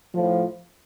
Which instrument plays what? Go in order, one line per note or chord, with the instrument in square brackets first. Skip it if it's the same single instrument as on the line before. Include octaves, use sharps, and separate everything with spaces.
[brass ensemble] A2 F3